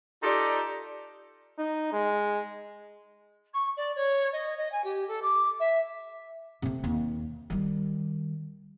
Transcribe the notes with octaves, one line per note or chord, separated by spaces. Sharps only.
D#4 F4 G4 A4 D5
D#4
G#3
C#6
D5
C#5
D#5
D#5
G#5
G4
A4
D6
E5
C3 A3
D#2
D#3 G3